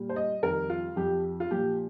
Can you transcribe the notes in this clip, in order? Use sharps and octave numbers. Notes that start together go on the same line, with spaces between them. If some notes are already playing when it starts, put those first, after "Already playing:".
Already playing: A#2 G3
C5
D#5
F2 D#3 G3 A#4
F4
F2 F3 G4
F4
A#2 F3 G4